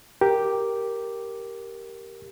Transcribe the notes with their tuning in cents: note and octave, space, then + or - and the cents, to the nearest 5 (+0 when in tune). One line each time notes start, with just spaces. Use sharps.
G4 +0 A#4 +0 D6 +0